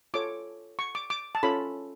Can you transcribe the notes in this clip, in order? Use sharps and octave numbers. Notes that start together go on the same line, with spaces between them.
F4 A4 C#5 D6
C#6
D6
D6
A5
C#4 F4 A4 C#5 B5